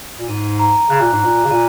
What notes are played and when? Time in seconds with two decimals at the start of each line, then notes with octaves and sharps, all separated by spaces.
0.19 A#2
0.28 G#2 D#7
0.59 A#5
0.90 C#3 F#6
1.01 A#2
1.13 G#2
1.21 A#2 A#5
1.45 C#3
1.51 A#2 D#7